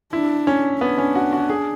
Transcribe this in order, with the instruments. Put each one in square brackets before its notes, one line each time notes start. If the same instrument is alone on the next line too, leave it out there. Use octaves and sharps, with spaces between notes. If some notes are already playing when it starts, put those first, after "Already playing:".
[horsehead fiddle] D4 [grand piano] E4
[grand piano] C#4
[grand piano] B3 [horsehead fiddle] D4
[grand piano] C#4
F#4
F#4
G#4